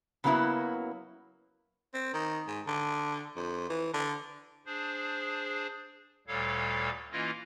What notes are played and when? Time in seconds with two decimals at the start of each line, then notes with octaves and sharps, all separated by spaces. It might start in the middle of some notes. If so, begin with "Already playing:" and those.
0.24 C#3 F#3 A#3 B3 E4 F#4
1.94 C4
2.14 D#3
2.48 G#2
2.67 D3
3.36 F2
3.69 E3
3.93 D3
4.66 D4 G#4 C5
6.27 D2 A#2 G3 A4 C#5 F5
7.12 E3 A#3 C#4 E4 F4 D#5